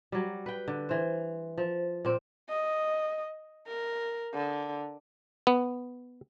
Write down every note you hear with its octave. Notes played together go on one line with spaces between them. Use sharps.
F#3 G3
B4 G5
D3
E3 C5
F3
A#2 C4
D#5
A#4
D3
B3